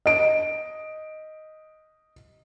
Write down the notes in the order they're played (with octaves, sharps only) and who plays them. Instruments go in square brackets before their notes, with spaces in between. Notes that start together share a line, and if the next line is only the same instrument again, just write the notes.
[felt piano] D#5 D7